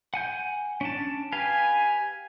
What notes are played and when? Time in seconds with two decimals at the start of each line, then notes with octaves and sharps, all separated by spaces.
0.14 F#5 G#5 G6
0.81 C#4 D4 A5
1.32 G4 B4 F5 G#5